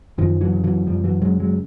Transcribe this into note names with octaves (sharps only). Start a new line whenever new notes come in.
F#2 D#3 F3
E3 F#3
C#3
E3 F#3
F#2 F3 G3
E3 F#3
C#3 F#3 G#3
F#3 G#3